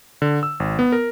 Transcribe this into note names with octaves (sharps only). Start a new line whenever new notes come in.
D3
E6
G#1
B3
A#4